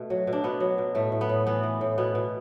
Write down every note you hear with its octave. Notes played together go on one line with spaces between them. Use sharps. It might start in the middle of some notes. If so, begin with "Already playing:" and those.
Already playing: B2 A3
F#3
B2
D4
B2 B3
F#3
B2
A2 A3
A2
B3
A2
E3 B3
E3
A2
B2 B3
B2